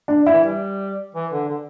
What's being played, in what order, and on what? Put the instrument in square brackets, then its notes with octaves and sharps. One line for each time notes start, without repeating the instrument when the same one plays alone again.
[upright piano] D4
E4
[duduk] E3
G3
E3
D3
D3